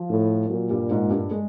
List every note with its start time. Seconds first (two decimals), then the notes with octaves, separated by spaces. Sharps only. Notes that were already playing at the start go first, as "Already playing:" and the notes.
Already playing: F3
0.09 A2
0.50 A#2 F#3
0.70 G2 G3
0.90 G#2 G#3
1.10 G2 G3
1.31 G#3